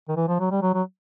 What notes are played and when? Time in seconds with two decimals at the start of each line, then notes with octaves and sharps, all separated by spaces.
0.09 D#3
0.16 E3
0.28 F3
0.40 F#3
0.51 G3
0.62 F#3
0.74 F#3